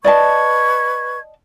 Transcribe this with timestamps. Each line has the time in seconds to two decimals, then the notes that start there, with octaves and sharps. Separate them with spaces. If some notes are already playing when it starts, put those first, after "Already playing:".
0.04 B4 D5 D#5 A5 C#6 G#6